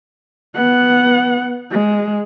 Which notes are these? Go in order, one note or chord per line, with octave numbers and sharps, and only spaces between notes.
B3 F#5
G#3